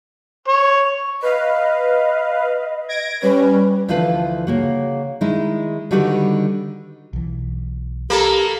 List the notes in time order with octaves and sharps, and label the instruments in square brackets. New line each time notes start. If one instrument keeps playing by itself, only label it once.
[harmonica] C#5
[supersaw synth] B4 F5 [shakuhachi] D#5
[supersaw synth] G#6 A#6 D7
[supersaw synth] G3 C#4 [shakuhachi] B4
[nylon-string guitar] D2 E3 F3 F4 B4 A5
C#3 A#3 F#4
D#3 G#3 D#4 E4
D3 D#3 G3 F#4 G4 B4
[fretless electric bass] B1 E3
[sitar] A#3 [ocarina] G4 [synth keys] A4 A#5 B5